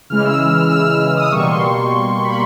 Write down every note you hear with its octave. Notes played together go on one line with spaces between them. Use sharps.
C#3 E3 G#3 F6
E6
E6
F6
E6
F6
E6
D#6
B2 G3 A#3 C#6
C6
B5